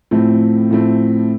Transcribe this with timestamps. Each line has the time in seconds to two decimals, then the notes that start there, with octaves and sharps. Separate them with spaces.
0.11 A2 F3 A3 C4
0.71 A2 F3 A3 C4